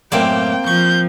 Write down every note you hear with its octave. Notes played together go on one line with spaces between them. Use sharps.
F#2 A2 A#3 C4 D5 G5
F3 C#6 G6